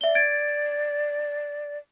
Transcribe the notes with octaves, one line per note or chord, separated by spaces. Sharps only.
D5 E5 G7
G#6 A6 D7